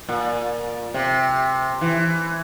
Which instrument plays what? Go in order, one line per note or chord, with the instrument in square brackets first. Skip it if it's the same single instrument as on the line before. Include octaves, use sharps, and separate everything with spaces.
[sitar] A#2
C3
E3